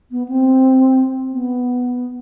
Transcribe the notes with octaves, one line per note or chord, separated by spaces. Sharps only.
B3
C4
B3